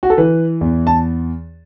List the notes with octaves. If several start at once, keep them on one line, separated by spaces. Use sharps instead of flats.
F#4
A4
E3 B4
E2
A5